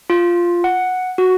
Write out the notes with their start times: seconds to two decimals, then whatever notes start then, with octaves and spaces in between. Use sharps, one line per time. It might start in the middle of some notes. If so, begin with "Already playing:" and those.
0.10 F4
0.64 F#5
1.18 F#4